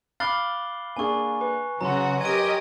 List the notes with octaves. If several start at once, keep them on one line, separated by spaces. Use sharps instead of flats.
F5 B5 D6 F6 F#6 A6 G7
A#3 D4 G#4 G#5 C#6
B4
C#3 F#3 F#4 A#5 C6
G4 A#4 D#5 G#6 D7